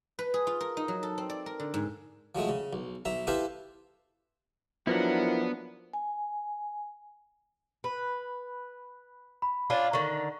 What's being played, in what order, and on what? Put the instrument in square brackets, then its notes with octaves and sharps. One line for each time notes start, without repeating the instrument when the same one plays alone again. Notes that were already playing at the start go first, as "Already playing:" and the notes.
[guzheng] B4
G#4
F4
A#4
D#4
F#3
A4
C4
D5
A#4
D3
G#2
[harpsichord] F3 F#3 G#3 A3
C#3
B1
B1 E5 A#5
E4 G4 A4 B4 C5 F5
[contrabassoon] F3 [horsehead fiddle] F#3 D4 [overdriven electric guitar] B3 [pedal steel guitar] E4 A#4 F#5
[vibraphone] G#5
[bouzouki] B4 [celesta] B5
[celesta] B5
[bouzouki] C#4 D4 F4
[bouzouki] D3 D#3 [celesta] C#6